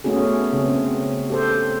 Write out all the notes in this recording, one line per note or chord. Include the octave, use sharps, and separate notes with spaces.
A3 B3 C#4 F#4 G#4
C#3 C4
G4 A4 C5